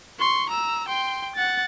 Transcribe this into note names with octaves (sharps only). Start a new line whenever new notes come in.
C6 C#6
A#5 E6
G5 C6
F#5 A6